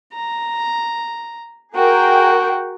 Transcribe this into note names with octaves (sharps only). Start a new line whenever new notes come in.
A#5
F#4 G#4 A#4 G5